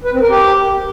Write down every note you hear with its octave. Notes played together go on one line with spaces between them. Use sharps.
B4
C4
A#4
G4